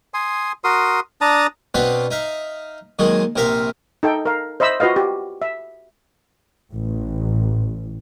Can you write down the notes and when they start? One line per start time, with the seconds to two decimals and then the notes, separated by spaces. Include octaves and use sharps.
0.14 G#5 C6 D#6
0.64 F#4 A#4 C6 D#6
1.21 D4 A5 A#5 D#6
1.75 B2 B3 C4 D4 B4 F5
2.11 D#4 E5 F5
2.99 A#2 D#3 F#3 G#3 G#4
3.36 A#1 C3 A#4 E5 F5
4.03 D#4 A4 G5
4.25 A#4 F5
4.60 C5 D#5 E5 B5 E6
4.80 F4 F#4 B4 D#5 F5
4.96 G4
5.42 E5
6.72 A1